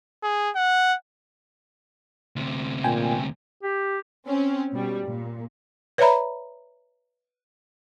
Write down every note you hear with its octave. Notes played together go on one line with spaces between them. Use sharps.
G#4
F#5
D2 C3
A#2 G5 G#5
G4
C4 C#4
B2 G3
A#2
B4 C#5 D5 E5 A#5 B5